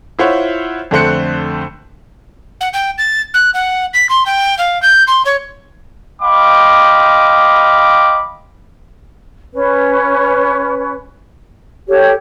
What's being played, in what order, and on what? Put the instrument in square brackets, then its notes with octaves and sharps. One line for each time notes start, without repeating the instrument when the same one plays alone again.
[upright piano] E4 F4 C5 C#5 E5 F#5
F2 D3 A3 C5 F#6 C#7
[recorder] F#5
G5
A6
F#6
F#5
B6
C6
G5
F5
G6
C6
C#5
[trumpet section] D#5 F5 G5 B5 C6 D6
[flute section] C#4 B4
G4 A4 C#5